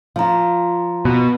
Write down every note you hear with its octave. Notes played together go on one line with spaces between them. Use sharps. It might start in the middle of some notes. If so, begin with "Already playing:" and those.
F3 F4 F5 A#5
B2